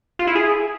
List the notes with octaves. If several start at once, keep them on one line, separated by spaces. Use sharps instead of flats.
F4
E4
G#4